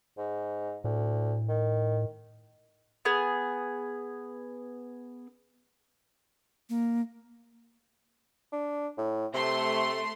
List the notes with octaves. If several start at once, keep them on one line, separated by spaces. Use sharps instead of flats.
G#2
D2 A2
D#3
B3 G#4
A#3
D4
A2
C3 A3 C6